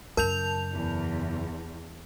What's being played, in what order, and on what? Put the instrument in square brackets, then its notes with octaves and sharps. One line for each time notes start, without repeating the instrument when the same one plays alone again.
[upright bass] F#2 C#3 [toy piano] A#4 [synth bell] A5 G6 F7
[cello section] E2